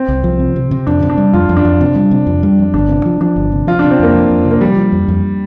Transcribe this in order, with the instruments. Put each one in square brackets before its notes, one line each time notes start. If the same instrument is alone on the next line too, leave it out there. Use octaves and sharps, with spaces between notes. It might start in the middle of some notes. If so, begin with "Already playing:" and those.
Already playing: [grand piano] C4
[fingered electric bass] C2
F3
C3
C3
C3
[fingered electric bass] F2 [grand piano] D4
[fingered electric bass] C3
[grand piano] D4
[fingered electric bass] G3
[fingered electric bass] F2 [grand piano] F4
[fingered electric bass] F2
[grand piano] D4
[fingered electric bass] F2
C3
G3
C3
F2
G3
F2
[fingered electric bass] G1 [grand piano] D4
[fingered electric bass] C3
F3
[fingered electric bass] F3 [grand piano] D4
[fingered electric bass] G1
C3
[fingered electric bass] F3 [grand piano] F4
[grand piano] D4
[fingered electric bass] C3
[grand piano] C4
[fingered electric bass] F2 [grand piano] A#3
[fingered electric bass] F3
F2
C3
[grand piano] A#3
[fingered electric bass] F3 [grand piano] G3
[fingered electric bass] F3
F2
F2